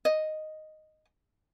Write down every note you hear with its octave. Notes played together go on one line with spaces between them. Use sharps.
D#5